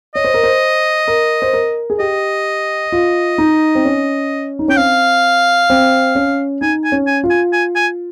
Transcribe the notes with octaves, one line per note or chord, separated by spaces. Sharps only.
C#5 D#5
C5
A#4
C5
A#4
C5
A#4
G#4
G4 D#5
F4
D#4
C4
C#4
D#4
C#4 G5
C4 F5
C4
C#4
D#4 G#5
G#5
C#4
G#5
F4
G#5
G#5
G#5